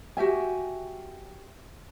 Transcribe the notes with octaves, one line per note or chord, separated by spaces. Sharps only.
F#4 G4 E5 G#5